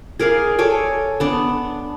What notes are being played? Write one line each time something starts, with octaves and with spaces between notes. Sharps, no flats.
G#4 A#4 D5 F5
A4 C#5 G#5 D6
B3 D4